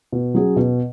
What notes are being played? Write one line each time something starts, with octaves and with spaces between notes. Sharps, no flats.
B2
F#3 C#4 G#4
B2